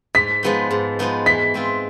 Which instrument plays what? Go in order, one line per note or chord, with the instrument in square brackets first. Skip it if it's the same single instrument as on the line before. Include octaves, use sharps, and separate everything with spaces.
[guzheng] G#2 [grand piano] B6
[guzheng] F3 G#3 B3 D#4
G#2
F3 G#3 B3 D#4
[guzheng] E3 [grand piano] B6
[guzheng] G#3 C4 F4